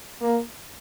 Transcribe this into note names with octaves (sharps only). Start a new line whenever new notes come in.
A#3